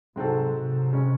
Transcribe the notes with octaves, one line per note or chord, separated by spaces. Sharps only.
G#2 C3 F#3 C4 F#4 A4
C3
C#3 G#3 C#4